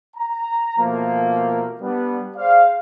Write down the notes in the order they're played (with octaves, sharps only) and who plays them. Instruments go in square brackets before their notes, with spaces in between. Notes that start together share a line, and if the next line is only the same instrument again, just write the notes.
[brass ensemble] A#5
B2 F3 A3 A#3
G3 B3 D4
G#4 C5 D5 F5